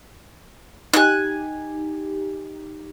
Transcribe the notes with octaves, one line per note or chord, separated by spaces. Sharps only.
D#4 G4 G#5 F#6